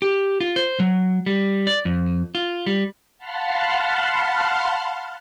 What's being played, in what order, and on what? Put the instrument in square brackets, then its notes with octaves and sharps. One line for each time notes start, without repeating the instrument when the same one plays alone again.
[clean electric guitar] G4
F4
C5
F#3
G3
D5
F2
F4
G3
[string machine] F5 F#5 A5 B5 C6 F6